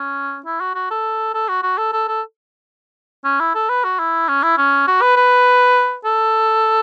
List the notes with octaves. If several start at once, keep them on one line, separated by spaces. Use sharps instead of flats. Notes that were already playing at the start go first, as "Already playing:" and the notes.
Already playing: C#4
E4
F#4
F#4
A4
A4
F#4
F#4
A4
A4
A4
C#4
E4
A4
B4
F#4
E4
C#4
E4
C#4
F#4
B4
B4
A4